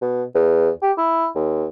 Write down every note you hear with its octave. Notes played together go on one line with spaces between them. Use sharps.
B2
E2
G4
E4
D#2